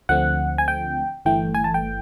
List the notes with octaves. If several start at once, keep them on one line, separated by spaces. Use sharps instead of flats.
D2 D3 F3 A3 C4 F#5
G#5
G5
G1 G2 E3 A3 G5
G#5
A5
G5